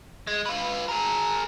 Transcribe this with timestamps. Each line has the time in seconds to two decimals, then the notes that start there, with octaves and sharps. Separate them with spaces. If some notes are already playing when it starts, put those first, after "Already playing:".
0.27 G#3
0.46 F4 B4
0.88 G#4 A#4